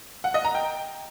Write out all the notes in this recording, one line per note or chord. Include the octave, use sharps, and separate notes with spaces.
F#5
D#5
A#5
G5